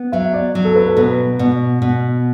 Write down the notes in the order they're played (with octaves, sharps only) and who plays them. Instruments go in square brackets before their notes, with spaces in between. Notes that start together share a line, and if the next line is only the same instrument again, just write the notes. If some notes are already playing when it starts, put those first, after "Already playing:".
Already playing: [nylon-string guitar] B3
[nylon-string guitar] F#3 [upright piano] E5
[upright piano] D5
[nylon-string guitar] F#3
[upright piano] A4
B4
A4
[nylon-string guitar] B2 [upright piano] B4
[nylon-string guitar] B2
B2